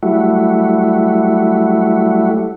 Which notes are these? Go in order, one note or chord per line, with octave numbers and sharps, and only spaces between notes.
F#3 G3 A3 E4 F#4